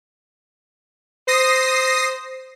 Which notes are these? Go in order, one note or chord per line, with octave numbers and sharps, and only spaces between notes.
C5 D#6 A#6 C7